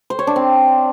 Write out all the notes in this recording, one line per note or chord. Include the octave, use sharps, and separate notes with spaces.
C5
C#5
D4
C4